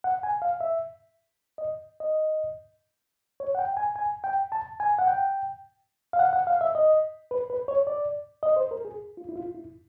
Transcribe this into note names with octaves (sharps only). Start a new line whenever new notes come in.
F#5
G#5
F5
E5
D#5
D#5
C#5
F#5
G5
G#5
G#5
G5
A5
G#5
F#5
G5
F5
F#5
F#5
F5
E5
D#5
B4
B4
C#5
D5
D#5
C5
A#4
G#4
F4
E4
F4
E4